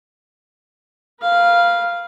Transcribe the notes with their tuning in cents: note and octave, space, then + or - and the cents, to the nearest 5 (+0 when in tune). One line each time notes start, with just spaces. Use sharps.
B4 -35 F5 -5